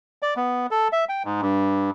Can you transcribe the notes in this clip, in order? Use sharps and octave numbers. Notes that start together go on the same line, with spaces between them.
D5
B3
A4
E5
G5
G#2
G2